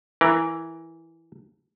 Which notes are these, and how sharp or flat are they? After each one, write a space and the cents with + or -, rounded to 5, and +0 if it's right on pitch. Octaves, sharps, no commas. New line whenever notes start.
E3 +0 A#4 +15